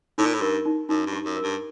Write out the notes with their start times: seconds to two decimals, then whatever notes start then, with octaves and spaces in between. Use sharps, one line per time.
0.18 A2 D#4
0.26 A#2
0.34 A2
0.41 G2 A#4
0.66 D#4
0.89 F#2 D#4
1.06 G2
1.13 G4
1.25 F#2
1.37 A#4
1.43 G2